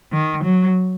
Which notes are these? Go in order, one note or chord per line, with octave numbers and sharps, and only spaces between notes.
D#3
F#3